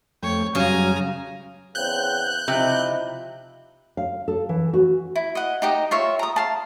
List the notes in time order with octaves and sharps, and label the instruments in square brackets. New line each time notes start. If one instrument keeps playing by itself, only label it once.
[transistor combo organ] F2 A3 G5 [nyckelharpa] C#5
[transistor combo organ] F#2 F#3 G3 [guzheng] C#3 [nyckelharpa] G#5 A#5
[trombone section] E2 C#3 C4 [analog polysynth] F#6 G6
[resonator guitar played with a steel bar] C3 [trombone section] F3 D#4 E4
[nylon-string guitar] F5
A4
E3
F#4
[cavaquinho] E4
D#5 F#5
D#4 G4 D#5
F4 C#5 E5
A#5 D#6
F5 A5